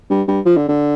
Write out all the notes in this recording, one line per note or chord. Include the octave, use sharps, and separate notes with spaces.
G2
G2
F3
D3
D3